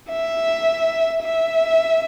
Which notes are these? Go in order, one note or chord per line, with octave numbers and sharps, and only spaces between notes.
E5
E5